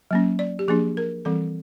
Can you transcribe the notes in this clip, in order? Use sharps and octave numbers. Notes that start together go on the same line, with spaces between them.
F#3 A#3 C#4
D5
G4
F3 A#3 D4 G#4
A#4
E3 G3 C4 A4